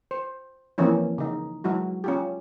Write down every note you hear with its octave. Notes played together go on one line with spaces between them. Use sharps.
C5
E3 F3 A#3 C4 C#4 E4
C#3 D#4
F#3 G#3 E4 F#4
C#4 F4 G4